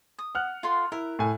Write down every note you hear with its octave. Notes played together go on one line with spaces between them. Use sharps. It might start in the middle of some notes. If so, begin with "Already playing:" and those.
D#6
F#5 F6 F#6
F4 A4 C6
E4 A#4
A2 A4 G#5